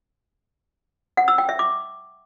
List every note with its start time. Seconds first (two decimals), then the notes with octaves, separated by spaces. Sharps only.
1.17 F#5
1.28 E6
1.38 G5
1.49 E5
1.59 D6